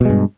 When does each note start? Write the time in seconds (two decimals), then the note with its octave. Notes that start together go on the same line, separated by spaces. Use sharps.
0.01 B2
0.05 G#3
0.10 G2